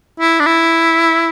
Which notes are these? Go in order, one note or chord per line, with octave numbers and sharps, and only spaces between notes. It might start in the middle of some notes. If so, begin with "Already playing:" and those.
E4
D4
E4